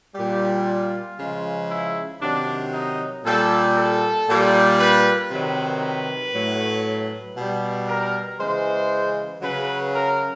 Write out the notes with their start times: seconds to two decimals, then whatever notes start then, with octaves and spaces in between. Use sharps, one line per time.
0.15 A#2 G3 G4
0.66 F4
1.18 C#3 F3 G#3
1.69 E4
2.20 C3 D#3 F#3 D4
2.72 D#4
3.24 A#2 G3 A4
3.76 A4
4.27 A#2 G3
4.78 B4
5.30 C3 D#3 F#3 B4
5.81 B4
6.33 A2 F#3
7.36 B2 G3
7.88 A#4
8.39 C#3 E3 G#3 C5
9.42 C#3 F#3 B4
9.94 A#4